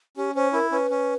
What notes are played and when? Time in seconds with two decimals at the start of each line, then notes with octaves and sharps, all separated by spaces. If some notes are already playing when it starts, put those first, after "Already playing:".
0.17 C#4 G4
0.35 C#4 C5
0.53 E4 A#4
0.72 C#4 B4
0.90 C#4